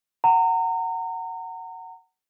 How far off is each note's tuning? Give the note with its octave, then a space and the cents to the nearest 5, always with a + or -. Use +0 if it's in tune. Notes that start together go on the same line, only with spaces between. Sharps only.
F#5 +15 A#5 -30